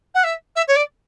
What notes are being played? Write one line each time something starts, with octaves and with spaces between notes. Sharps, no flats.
F#5
E5
E5
C#5
D5